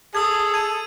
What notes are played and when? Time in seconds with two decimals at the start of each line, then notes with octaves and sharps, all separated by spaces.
0.15 G#4 A4 D#6 E6 G#6
0.54 G#6 D#7